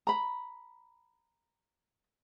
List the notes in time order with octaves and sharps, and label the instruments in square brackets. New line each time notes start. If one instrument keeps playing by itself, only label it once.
[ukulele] A#5 B5